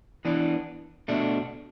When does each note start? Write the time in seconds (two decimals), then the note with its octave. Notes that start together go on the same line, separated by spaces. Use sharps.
0.25 E3 B3 D4
1.08 B2 A3 D4